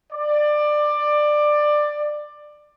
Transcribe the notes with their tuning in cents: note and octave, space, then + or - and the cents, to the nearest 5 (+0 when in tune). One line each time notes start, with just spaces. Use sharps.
D5 +20